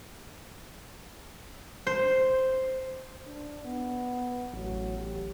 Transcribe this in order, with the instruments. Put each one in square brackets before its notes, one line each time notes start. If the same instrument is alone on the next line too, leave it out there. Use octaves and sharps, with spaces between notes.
[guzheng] C5
[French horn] D4
B3
[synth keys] A1 [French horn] F#3
[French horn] G4